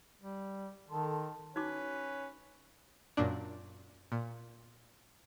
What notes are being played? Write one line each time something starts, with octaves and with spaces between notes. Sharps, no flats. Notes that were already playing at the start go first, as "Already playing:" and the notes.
G3
D#3 A4 A5 C6
C#4 D#4 F#4 B4 D6
F#2 A#2 D4
A#2